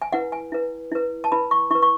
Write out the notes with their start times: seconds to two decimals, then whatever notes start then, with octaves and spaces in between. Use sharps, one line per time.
0.02 G#5
0.13 E4 B4 F#5
0.32 G#5
0.52 E4 B4
0.92 E4 B4
1.24 A5
1.32 E4 B4 B5
1.51 C#6
1.71 E4 C#6
1.75 B4
1.82 C#6